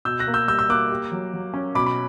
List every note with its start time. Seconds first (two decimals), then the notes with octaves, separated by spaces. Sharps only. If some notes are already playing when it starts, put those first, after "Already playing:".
0.05 B2 E6 G6
0.19 F#6 A#6
0.27 A#3
0.34 E6 G6
0.48 G3 E6 G6
0.59 E6 G6
0.69 A#3 D6 F#6
0.90 G4
1.12 F#3
1.34 F#3
1.54 C#4
1.75 B2 B5 D6
1.86 B5 D6